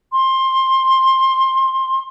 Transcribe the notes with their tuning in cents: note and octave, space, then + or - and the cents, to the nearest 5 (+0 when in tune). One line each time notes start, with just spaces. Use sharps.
C6 +15